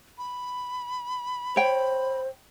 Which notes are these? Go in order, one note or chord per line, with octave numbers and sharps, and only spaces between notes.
B5
C5 C#5 G5